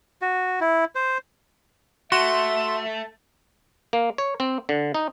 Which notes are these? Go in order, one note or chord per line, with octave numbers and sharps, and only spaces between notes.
F#4
E4
C5
A3 F#4 E5 C6
A#3
C#5
C4
D3
D#4